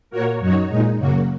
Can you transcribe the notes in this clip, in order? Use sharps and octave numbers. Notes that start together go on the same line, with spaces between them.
A#2 A#3 F#4 A#4 C#5
F#2 F#3 D#4 F#4 C#5
A#2 G#3 D#4
F#2 C#3 F#3 A#3 F#4